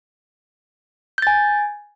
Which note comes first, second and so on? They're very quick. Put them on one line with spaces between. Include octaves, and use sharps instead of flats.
G6 A6 G#5